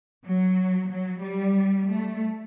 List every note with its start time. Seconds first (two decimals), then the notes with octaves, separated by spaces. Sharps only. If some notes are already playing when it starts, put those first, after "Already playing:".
0.25 F#3
0.90 F#3
1.22 G3
1.89 A3